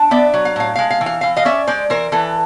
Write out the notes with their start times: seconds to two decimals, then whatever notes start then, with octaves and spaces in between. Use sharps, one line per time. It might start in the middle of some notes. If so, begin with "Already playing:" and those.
Already playing: D4
0.11 B3 D5 E5
0.34 F#3
0.45 F5
0.56 A2 F5
0.76 F5
0.78 G#3
0.90 F5
1.01 E3
1.06 F5
1.21 E3 F5
1.36 D#5 F5
1.45 C#4 D5 E5
1.67 G#3 C5 D5
1.90 E3 A#4 C5
2.12 E3 A4 B4